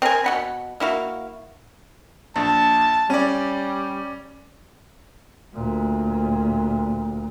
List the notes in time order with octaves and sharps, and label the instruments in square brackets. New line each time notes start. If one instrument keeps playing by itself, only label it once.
[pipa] C4 A#4 E5 G#5
B2 F#5 B5
A#3 E4 F#4 F5
[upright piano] A#1 [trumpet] A5
[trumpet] G3 [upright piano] C#4 D5
[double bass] D2 A#2